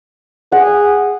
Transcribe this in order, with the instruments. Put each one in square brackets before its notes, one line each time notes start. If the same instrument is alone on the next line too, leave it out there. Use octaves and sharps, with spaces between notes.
[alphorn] G#4 [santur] F#5